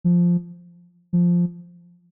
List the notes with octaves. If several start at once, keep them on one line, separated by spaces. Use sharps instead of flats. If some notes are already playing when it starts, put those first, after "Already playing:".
F3
F3